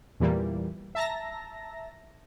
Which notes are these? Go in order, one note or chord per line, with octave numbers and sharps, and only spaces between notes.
E2 A#2 E3 G3 A#3
E5 A5 A#5 A#6